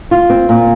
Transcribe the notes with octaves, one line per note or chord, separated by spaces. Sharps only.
F4
C4
A#2